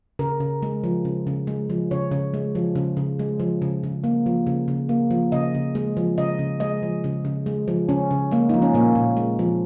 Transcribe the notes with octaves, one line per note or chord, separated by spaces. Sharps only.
C#3 A#4
C#3
G#3
F3
C#3
C#3
G#3
F3
C#3 C#5
C#3
G#3
F3
C#3
C#3
G#3
F3
C#3
C#3
A#3
F3
C#3
C#3
A#3
F3
C#3 D#5
C#3
G#3
F3
C#3 D#5
C#3
G#3 D#5
F3
C#3
C#3
G#3
F3
C#3 C#4
C#3
G#3 A#3
F3 D#4
C#4
A#2 A#3
A#2
G#3
F3